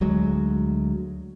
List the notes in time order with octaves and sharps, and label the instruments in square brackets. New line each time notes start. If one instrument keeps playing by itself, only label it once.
[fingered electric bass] D2 F#3 G#3